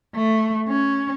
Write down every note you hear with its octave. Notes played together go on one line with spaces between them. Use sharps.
A3
C#4